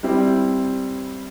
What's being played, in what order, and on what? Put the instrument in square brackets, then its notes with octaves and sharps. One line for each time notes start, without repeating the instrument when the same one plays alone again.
[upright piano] G3 C4 E4 G4